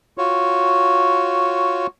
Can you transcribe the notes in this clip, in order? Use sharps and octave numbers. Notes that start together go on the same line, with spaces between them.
F4 F#4 C#5